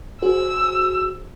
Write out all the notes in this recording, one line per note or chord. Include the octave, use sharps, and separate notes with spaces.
F#4 G#4 C5 E6